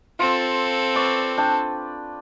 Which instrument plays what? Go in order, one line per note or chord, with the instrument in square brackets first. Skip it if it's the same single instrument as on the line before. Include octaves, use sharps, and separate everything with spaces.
[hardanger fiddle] C4 A4 [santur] F4
[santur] B4 D5 C#6
D4 G5